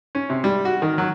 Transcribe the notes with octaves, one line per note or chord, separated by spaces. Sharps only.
C#4
C3
G3
F#4
D#3
F#3